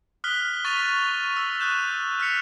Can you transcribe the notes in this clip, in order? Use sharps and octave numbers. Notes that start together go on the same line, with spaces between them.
D#6 F6 F#6 B6 G7
C#6 A6 B6 D#7 F7 G7
E6
D#6 F#6 G6 E7
F6 B6 C#7 F7